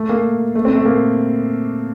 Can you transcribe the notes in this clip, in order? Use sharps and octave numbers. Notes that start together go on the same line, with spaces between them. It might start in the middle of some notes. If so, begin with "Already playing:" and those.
Already playing: A3
A#3
A3
C4
A3
A#3